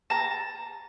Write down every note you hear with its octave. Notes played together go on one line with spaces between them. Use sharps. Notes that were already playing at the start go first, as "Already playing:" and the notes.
A5 A#5